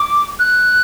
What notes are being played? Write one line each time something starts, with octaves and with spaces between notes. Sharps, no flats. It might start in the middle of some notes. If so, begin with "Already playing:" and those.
Already playing: D6
F#6